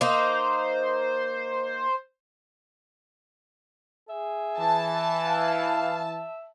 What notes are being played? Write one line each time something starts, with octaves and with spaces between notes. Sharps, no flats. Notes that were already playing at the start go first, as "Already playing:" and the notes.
A#3 D#4 C5
G#4 E5
E3 A5
F5